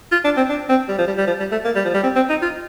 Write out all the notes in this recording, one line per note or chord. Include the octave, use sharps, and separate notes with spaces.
F4
D4
C4
D4
C4
G3
F3
G3
G3
F3
G3
A3
A#3
G3
F3
G3
C4
C4
D#4
F4